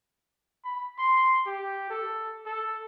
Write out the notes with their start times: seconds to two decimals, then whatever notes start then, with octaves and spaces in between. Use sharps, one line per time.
0.64 B5
0.98 C6
1.46 G4
1.90 A4
2.46 A4